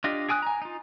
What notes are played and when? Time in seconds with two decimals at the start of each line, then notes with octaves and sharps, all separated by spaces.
0.04 D4 F4 G4 D#5
0.29 G#4 G5 G#5 D#6 F#6
0.42 G#5 A#5
0.62 D#4 F4